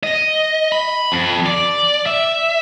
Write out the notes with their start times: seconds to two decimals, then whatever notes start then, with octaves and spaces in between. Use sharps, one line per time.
0.03 D#5
0.72 B5
1.12 F2
1.46 D5
2.06 E5